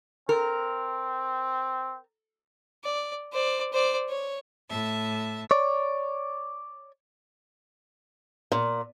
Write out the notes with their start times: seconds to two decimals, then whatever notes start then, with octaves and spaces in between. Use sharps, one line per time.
0.29 C4 A#4
2.84 D5
3.32 C5 D5
3.73 C5 D5
4.09 C#5
4.68 A2 E5 A5
5.51 C#5 D5
8.52 A#2